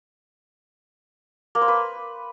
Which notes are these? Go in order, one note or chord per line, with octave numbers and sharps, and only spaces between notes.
A#3
C5
B4